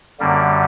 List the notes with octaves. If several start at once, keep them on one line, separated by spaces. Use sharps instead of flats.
F#2 D3 G3 A#3